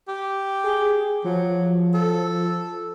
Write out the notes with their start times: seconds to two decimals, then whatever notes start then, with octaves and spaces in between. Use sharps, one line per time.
0.08 G4
0.64 G#4
1.24 F3 F#3
1.94 A4